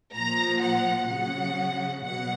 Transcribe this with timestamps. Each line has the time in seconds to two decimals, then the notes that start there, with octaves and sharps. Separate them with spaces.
0.14 A#2 F3 A#5
0.61 F#5
1.07 C#3 F#3 F#5
2.02 B2 F#3 F#5